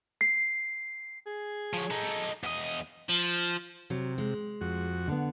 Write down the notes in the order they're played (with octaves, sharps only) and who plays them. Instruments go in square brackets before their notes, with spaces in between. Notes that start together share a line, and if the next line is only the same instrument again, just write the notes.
[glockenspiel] C7
[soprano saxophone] G#4
[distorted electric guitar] F3 C#5
D#4 A4
E2 D#5
F3
[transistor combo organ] C3 [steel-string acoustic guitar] F#3
[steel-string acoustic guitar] G#3
[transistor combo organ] F2 F#4
[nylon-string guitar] D3 B3